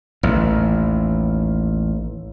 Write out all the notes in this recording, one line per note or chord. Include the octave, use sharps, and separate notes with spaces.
A1 D#2